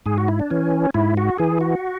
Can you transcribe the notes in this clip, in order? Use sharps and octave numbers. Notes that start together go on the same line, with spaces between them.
G#2 G#4
F#4
E4
D4
E3 C#4
G#2 E4
F#4
E3 G#4
F#4